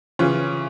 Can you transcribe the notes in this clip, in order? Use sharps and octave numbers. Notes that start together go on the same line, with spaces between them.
C#3 E3 C#4 F4